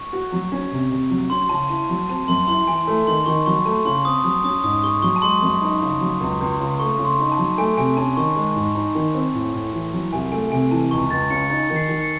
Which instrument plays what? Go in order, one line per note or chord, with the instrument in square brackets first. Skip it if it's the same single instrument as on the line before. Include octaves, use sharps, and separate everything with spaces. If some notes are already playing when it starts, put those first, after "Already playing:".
Already playing: [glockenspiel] C#6
[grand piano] F#4
F#3
C#4
C3
C3
F#3
[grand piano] C#4 [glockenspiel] C6
[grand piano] C#3 [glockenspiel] A5
[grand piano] E4 [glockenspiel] A5
[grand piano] F#3
[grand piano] C4 [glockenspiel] A5
[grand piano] F#2 [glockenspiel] C6
[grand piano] E4 [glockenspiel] C6
[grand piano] E3 [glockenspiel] G#5
[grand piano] A3 [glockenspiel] A5
[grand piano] D#3 [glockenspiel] C6
[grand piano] D#3 [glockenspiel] C#6
[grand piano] F#3 [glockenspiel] C#6
[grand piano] A3 [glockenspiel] A5
[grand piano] C#3 [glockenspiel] C6
[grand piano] C4 [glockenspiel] D#6
[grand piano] F#3 [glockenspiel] D#6
[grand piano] C#4 [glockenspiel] D#6
[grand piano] G#2 [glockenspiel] D#6
[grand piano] G#4 [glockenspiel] C#6
[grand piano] F#3 [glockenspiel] C#6
[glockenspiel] A5
[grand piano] G#3 [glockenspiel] C6
[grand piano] F#2
D#4
C#3
F#3
C#2
C#2
C#3
[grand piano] A3 [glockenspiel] C#6
[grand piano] C#3
[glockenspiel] C6
[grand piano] D#4
[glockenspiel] A5
[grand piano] F#3
[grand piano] A3 [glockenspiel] G#5
[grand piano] C3 [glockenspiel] G#5
[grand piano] C#4 [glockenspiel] A5
[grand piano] D#3 [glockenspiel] C#6
[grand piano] G#3
G#2
D#4
D#3
C4
A2
A2
E3
F#3
[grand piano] C2 [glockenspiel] G#5
[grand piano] A3 [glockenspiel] G#5
[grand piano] C3 [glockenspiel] G#5
[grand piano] E3 [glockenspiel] A5
[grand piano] C#2 [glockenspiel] C#6
[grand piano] C#2 [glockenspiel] A6
[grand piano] C#3 [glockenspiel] C#7
[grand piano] D#4 [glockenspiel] A6
[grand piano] D#3
[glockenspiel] C7
[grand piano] D#3
[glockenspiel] C#7